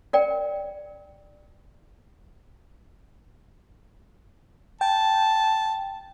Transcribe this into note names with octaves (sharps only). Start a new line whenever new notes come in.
A#4 D5 G5
G5 A5